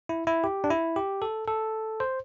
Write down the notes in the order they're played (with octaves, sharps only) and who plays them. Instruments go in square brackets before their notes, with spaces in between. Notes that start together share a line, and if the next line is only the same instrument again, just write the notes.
[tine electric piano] E4
E4
G4
D4
E4
G4
A4
A4
C5